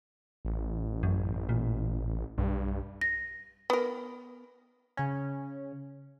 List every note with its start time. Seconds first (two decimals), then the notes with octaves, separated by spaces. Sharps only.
0.45 A1
1.03 F#2
1.49 A#2
2.38 B1 G2
3.01 A#6
3.70 B3 A#4
4.97 C#3 C#4